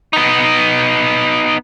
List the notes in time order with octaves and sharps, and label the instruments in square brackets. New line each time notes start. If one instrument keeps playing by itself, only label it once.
[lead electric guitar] B3 D#4